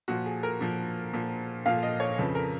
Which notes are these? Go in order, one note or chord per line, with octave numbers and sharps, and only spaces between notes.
A#2 F3 F#4
G#4
A#4
A#2 F3
A#2 F3
A#2 F3 F5
D#5
C#5
F2 C#3 F3 B4
A#4